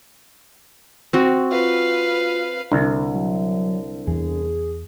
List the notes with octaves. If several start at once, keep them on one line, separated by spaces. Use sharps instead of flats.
C4 F#4
F4 B4 F5
C2 D3
F#3
E2 E3 G#4